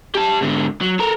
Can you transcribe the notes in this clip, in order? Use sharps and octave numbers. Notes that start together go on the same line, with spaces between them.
G4 A5
G#2 D3
F#3
A4 A#4